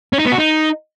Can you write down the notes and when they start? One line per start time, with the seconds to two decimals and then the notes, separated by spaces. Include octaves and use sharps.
0.13 C#4
0.19 D#4
0.26 B3
0.32 F#4
0.38 D#4